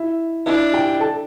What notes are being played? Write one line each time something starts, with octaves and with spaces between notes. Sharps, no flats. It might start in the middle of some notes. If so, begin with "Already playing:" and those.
Already playing: E4 E5
D4 E4 E5
G4 G5
A4 A5